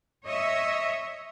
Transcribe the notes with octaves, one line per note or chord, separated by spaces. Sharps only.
C#5 D#5 E5